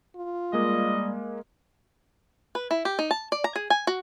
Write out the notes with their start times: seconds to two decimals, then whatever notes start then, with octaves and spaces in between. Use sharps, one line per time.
0.16 F4
0.53 G3 G#3 A#3 D#5
2.55 B4
2.71 E4
2.85 G4
2.99 D#4
3.11 A5
3.32 D5
3.44 A#5
3.56 G#4
3.70 G#5
3.87 F#4